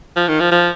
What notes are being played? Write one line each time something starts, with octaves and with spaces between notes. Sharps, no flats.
F3
D#3
F3
F3